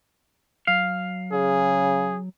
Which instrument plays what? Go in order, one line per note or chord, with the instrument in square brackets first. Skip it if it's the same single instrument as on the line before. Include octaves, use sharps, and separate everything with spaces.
[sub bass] F#3 [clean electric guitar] F5
[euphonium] C#3 [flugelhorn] G#4